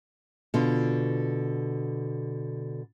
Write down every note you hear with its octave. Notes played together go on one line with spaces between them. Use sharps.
B2 D3 F4